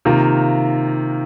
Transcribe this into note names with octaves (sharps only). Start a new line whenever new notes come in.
C3 D#3 A#3 F4 A#4